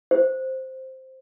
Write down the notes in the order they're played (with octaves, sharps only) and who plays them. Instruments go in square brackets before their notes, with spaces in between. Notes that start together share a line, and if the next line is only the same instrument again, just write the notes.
[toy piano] C5